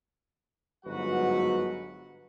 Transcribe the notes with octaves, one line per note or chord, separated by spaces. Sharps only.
G1 G#2 F#3 F#4 B4 F#5